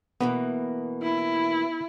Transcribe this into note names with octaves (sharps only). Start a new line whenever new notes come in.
B2 E3 A#3 B3
E4